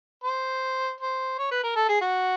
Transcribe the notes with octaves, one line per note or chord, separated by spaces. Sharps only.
C5
C5
C#5
B4
A#4
A4
G#4
F#4